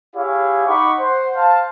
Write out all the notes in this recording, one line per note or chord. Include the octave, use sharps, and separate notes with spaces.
E4 G4 G#4 C#5 F5
D#4 F#5 B5 C#6 D6
C5 F#5
C5 F5 A5